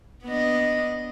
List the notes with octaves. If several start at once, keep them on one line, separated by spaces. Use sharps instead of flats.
B3 D4 D#5